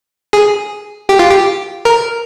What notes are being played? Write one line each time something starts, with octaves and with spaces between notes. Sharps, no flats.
G#4
G4
F4
G4
A#4